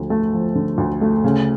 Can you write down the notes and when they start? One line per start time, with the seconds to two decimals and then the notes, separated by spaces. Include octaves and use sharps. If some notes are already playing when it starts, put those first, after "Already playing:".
Already playing: D2 D3 F3
0.10 A3
0.33 F3
0.55 D3
0.78 D2
1.01 A3
1.24 C#3